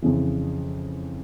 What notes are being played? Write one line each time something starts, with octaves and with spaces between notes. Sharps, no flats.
F2 C#3 E3